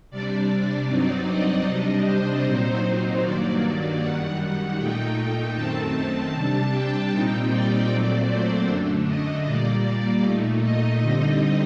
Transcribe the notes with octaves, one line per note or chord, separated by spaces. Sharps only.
C3 G3 D4 D5
D5
G2 F#3 C4 D#4
D#5
C3 G3 D4
C5
A#2 F#3 C4 D#4
G2 D#3 F#3 A#3 D5
F#2 D#3 G3 F#5
A#2 A3 D#4 G5
F#2 D#3 A3 C4 A5
C3 G3 D4
G5
A#2 G3 C4 D#4
D5
A#2 F#3 A3 C4
C5
F#2 D3 A3 D4
D#5
A#2 G3 A#3 D5
A#2 A3 D#4
D#5
D3 G3 C4 D#4